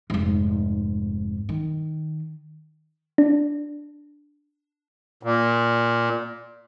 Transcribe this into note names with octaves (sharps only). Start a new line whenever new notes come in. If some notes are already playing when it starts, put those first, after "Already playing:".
F1 G#2
D#3
D4
A#2